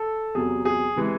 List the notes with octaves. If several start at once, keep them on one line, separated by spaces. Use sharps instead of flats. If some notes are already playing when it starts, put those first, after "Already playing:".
Already playing: A4
E2 C3 F#3 G#4
G#4
C3 E3 G#3